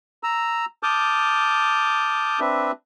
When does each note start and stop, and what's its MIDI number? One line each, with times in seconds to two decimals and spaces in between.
0.23 0.65 82
0.23 0.65 88
0.83 2.40 81
0.83 2.40 86
0.83 2.40 87
0.83 2.40 89
0.83 2.40 91
2.40 2.71 60
2.40 2.71 62
2.40 2.71 71
2.40 2.71 76